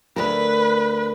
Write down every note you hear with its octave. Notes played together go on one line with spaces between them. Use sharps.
D2 A#4 B4